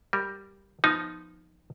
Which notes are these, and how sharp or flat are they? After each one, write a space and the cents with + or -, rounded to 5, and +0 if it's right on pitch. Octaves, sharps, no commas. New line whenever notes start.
G3 +0 A#4 +0
F3 +0 B3 +0 D#4 +0